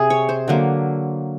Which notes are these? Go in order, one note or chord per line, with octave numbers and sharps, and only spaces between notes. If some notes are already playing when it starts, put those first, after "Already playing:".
Already playing: C3 G#4
C#5
C5
D3 F#3 A#3